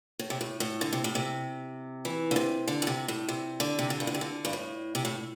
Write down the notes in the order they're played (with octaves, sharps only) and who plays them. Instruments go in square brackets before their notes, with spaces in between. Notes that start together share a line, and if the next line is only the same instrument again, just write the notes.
[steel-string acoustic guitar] A2
C3
A2
A2
D3
C3
A2
C3
E3
D3
C3
D3
A2
C3
A2
C3
D3
C3
D3
G2
A2
C3
D3
G2
A2
C3
A2